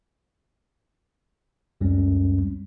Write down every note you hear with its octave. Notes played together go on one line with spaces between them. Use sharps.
C#2 F#2 G3 G#3 C4 C#4